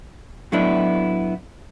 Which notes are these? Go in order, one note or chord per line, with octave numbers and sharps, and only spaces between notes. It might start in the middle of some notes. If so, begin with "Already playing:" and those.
A2 F#3 A3 B3 D4 E4